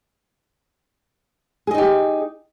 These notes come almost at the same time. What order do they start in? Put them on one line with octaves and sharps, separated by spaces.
G#4 D#5 D#4 G4